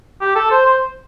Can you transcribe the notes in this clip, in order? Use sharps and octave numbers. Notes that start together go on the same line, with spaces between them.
G4
A4
C5
C5